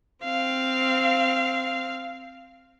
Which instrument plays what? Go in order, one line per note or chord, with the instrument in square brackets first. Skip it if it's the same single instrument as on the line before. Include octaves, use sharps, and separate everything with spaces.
[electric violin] C4 F5